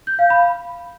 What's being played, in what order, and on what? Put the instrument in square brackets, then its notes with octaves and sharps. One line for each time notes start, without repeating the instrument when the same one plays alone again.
[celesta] G6
F5
B5